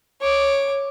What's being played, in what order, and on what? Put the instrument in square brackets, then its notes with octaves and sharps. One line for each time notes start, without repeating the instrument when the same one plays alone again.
[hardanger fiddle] C#5 D6